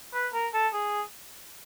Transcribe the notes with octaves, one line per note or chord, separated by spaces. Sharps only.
B4
A#4
A4
G#4